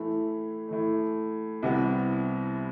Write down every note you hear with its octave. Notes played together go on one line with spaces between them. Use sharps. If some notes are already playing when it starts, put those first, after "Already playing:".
Already playing: A2 E3 A3
A2 E3 A3
C2 C3 E3 G3 B3